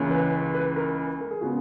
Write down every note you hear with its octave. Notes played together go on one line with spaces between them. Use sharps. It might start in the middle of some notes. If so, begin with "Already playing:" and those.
Already playing: C#2 C#3 E3 A#3 C#4
B4
B4
A#4
A#4
G#4
C#3 G#3 B3 F#4